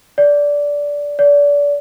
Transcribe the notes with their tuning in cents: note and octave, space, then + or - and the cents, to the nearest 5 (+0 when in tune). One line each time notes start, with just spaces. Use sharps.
D5 -15
D5 -30